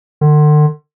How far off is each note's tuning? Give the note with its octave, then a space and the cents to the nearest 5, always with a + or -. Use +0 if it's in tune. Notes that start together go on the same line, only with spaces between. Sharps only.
D3 +40